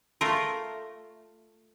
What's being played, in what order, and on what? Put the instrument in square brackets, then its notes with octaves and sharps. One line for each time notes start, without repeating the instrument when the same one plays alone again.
[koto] A3 F4 A#4